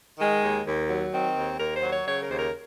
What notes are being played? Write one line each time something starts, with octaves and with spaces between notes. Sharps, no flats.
D#3 G#3
D#2
D#2
F#3
D#3 C4
D#2
D#2 A#4
C5
F#3
C#5
C#3 C#5
A#4
D#2 C5
A#4